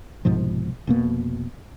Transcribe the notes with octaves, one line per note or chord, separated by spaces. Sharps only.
C2 G#2 B2 F3
F1 B2 A#3